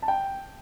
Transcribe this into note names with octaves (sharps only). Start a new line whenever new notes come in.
A5
G5